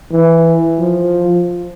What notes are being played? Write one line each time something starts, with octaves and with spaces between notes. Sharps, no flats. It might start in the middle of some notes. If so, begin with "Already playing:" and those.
E3
F3